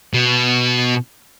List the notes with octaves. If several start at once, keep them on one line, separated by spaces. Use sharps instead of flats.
B2